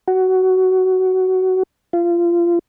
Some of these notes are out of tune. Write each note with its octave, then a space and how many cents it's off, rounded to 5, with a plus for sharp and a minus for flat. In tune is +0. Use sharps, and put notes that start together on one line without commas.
F#4 +15
F4 -25